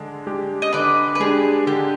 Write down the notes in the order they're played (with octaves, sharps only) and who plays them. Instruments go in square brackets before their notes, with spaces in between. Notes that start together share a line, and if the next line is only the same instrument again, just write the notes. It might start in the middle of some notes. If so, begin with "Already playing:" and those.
Already playing: [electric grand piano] D3 G#3 D4
G#3 D4 G4
[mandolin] D#5
[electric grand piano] D3 [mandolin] B4 D5
[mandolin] B4
[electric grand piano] G#3 D4 G4 [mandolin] G#4
[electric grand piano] D3 [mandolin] G4